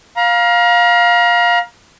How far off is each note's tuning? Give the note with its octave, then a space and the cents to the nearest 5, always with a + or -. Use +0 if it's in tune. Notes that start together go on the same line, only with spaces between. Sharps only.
F5 +10 A#5 +35